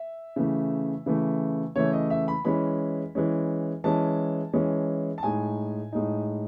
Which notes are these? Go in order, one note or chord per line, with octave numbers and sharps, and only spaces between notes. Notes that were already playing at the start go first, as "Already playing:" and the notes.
Already playing: E5
C#3 E3 A3
C#3 E3 A3
C#3 E3 A3 C#5
D#5
E5
B5
E3 G#3 C#4 B5
E3 G#3 C#4
E3 G#3 C#4 A5
E3 G#3 C#4
A5
A2 G#3 D#4 G#5
A2 G#3 D#4